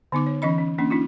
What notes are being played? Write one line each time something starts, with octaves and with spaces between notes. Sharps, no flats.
D3 B3 D#4 D6
C#5
E3 C#4 D#5 B5
C#4
A#3 C#4 D4
C#4 D#4 F4